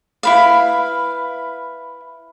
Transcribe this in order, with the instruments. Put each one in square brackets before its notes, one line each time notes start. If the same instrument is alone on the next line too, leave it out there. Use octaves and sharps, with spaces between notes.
[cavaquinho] E4 B4 F5